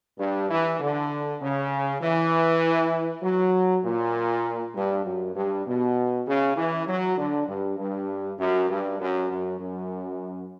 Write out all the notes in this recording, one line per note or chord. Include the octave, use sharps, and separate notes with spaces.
G2
E3
D3
C#3
E3
F#3
A#2
G2
F#2
G2
B2
C#3
E3
F#3
D3
G2
G2
F#2
G2
F#2
F#2
F#2